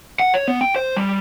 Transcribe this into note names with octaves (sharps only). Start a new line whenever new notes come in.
F#5
C#5
B3
G5
C5
G3